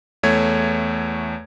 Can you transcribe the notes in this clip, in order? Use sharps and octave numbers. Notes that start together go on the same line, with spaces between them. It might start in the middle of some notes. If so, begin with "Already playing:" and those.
E2 A3 C#5 G#6